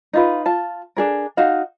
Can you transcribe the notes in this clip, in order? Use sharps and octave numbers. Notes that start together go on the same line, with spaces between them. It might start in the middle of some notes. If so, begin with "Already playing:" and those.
D#4 F4 B4
F4 A5
D4 G#4 A#4
D#4 F#4 F5